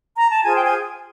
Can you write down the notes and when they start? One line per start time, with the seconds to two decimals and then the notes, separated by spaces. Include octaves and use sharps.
0.17 A#5
0.30 A5
0.44 F4 G#4 C5 G#5
0.56 G5
0.64 G#5